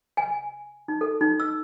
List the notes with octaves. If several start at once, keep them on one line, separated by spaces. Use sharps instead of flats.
G#5
D#4
A4
D#4
E6